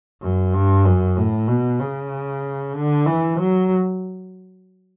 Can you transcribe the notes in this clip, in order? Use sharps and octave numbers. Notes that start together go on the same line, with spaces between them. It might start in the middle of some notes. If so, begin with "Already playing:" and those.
F#2
G2
F#2
A2
B2
C#3
D3
E3
F#3